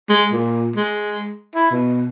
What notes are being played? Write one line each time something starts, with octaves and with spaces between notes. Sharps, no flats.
G#3
A#2
G#3
E4
B2